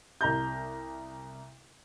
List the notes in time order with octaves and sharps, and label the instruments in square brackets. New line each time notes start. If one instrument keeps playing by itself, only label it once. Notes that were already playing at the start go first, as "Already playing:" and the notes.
[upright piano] C2 A#5 G6